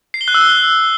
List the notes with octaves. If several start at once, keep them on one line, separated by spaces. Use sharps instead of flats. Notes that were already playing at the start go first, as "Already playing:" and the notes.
C7
G7
F#6
E6
G7